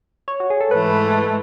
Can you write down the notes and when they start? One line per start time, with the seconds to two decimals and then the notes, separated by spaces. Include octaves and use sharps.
0.28 C#5
0.40 F#4
0.50 G#4
0.61 A4
0.71 G#2 E3 A3 B4